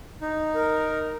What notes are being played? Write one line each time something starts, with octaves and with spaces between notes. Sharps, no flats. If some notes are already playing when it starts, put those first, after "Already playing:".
D#4
A#4